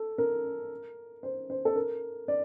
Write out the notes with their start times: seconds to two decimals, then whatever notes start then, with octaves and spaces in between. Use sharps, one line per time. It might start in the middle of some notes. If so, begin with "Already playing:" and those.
Already playing: A4
0.18 A#4
1.23 C5
1.50 C5
1.65 A4
1.76 A#4
2.28 D5